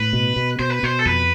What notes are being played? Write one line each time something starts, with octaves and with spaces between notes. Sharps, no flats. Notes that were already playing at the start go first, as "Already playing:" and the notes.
Already playing: A2 B4
B2
B2
B2 C5
B4
B2 C5
A4
F2 B4